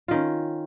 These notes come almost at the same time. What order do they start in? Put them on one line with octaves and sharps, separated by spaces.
F4 D#3 C#4